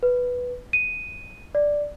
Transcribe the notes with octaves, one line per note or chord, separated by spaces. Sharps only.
B4
D#7
D5